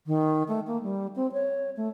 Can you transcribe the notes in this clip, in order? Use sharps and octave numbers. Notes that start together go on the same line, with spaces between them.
D#3
A3
A#3
G3
C4
C#5
A3